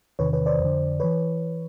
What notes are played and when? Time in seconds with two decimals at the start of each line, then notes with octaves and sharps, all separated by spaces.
0.19 E2 C3 D#3 B4 C#5
0.33 B4 C#5
0.46 C5 D5
0.59 F2 D3
1.00 E3 B4 C#5